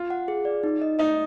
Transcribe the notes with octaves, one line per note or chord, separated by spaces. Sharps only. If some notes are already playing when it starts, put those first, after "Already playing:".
Already playing: F4
F#5
G#4
D5
D#4
D#5
D#4 D#5